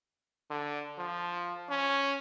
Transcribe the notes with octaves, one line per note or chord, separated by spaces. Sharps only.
D3
F3
C#4